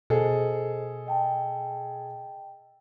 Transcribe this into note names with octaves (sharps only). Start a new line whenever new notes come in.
B2 G#4 A4 C5 D#5
D#5 G5 A5